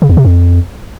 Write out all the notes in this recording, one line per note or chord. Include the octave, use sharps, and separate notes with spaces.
C#3
E2
C3
F2